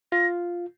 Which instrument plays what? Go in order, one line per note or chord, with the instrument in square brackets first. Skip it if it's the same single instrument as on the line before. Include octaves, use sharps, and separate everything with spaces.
[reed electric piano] F4 [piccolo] A#6